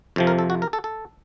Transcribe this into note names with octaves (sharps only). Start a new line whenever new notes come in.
F2 C3 F3
A#4
A4
F#4
A#4
A4
A4